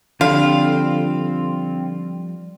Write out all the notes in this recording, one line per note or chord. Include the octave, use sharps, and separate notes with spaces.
D3 F3 G3 C4 F4 F5